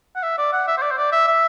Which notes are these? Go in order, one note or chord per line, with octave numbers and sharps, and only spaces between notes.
F#5
E5
D5
F#5
E5
C5
D5
C5
D5
E5
E5